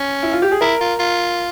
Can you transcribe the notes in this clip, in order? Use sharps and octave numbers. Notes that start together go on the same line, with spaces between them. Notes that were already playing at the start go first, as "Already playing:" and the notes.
Already playing: C#4
E4
F4
G4
G#4
E4 A#4
F4
F4